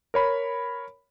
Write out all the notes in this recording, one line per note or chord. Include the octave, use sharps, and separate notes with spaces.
A#4 C#5 B5